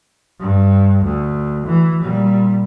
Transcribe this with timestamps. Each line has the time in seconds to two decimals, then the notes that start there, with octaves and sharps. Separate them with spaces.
0.40 G2
1.04 D2
1.66 E3
2.02 A#2 G3